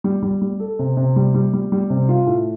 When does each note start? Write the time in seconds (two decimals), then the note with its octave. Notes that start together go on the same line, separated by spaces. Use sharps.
0.04 G3
0.23 G3
0.42 G3
0.60 A4
0.79 C3
0.97 C3
1.16 G3
1.34 G3
1.53 G3
1.72 G3
1.90 C3
2.09 F4
2.27 A2